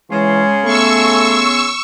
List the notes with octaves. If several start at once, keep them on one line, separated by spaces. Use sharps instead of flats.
C#3 E3 G#3 C#4 C6
A3 B3 C#6 E6